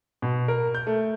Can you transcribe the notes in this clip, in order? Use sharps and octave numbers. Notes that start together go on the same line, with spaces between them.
B2
A#4
G6
A3